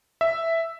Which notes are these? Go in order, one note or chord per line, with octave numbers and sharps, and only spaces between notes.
E5